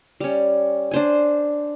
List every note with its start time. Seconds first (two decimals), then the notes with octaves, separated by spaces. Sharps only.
0.20 G3 C#4
0.91 D4 C5 G#5